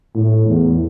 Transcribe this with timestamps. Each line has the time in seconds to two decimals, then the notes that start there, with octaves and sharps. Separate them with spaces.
0.14 A2
0.47 E2